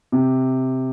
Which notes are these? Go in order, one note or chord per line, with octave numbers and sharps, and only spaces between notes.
C3